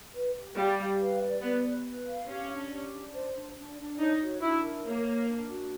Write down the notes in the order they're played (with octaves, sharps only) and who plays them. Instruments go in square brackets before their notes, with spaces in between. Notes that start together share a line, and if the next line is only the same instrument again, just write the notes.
[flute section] B4
G4
[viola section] G3 [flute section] F5
[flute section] F5
B4
D5
[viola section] B3 [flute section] B4
[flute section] B4
B4
F5
[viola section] C#4 [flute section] G4
[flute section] D4
G4
D4
C5
D4
D4
D4
[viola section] D#4 [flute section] C#5
[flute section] F#4
[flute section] D4 [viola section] E4
[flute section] A#4
[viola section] A#3 [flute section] C#5
[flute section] A#4
D4
F#4